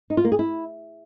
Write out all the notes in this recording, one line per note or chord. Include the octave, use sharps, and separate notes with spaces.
D#4
F4
A#3
G#4
E4